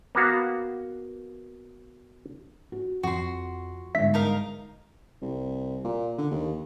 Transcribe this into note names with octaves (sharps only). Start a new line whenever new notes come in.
A#3 B3 F#4 F5
F#4
F2 F#4 C6
G1 G#2 E5 B6
D#4 A#4 F5
C2
A#2
D3
D#2